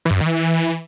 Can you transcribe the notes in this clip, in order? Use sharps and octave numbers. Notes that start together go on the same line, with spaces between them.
E3
G2
F#2
D#3
E3